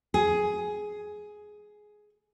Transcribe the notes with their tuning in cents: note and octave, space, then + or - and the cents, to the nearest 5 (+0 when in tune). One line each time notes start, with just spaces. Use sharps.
G#4 +10